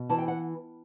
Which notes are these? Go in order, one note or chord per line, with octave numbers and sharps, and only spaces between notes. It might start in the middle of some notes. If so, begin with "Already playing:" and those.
Already playing: B2
E3 A5
G5
F#5